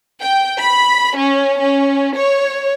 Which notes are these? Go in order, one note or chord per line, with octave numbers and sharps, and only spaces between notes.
G5
B5
C#4
C#4
C#5